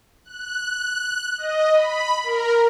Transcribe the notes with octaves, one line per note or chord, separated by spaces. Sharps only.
F#6
D#5
B5
A#4